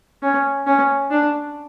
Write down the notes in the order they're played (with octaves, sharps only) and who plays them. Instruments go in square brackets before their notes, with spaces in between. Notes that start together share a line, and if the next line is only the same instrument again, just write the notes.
[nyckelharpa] C#4
C#4
D4